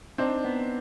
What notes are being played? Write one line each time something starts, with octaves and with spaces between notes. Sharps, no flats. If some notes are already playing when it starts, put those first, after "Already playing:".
C4 D4 D#4
B3